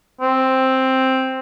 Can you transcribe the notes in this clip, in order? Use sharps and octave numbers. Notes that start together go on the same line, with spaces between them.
C4